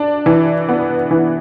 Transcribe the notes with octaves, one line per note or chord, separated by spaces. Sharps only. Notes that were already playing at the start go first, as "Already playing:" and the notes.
Already playing: D4
E3
B3
E3